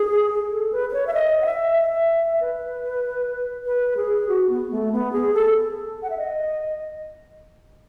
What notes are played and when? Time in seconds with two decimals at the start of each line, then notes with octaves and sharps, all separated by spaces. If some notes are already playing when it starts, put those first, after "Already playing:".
Already playing: G#4
0.51 A4
0.72 B4
0.90 B4
0.93 C#5
1.07 E5
1.14 D#5
1.42 F#5
1.46 E5
1.77 E5
2.41 B4
3.66 B4
3.97 G#4
4.29 F#4
4.49 B3
4.71 A3
4.92 B3
5.13 G#4
5.34 A4
6.03 F#5
6.10 E5
6.18 D#5